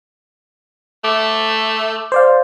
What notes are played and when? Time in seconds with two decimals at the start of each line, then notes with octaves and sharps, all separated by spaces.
1.04 A3 D6
2.12 C5 D5 F5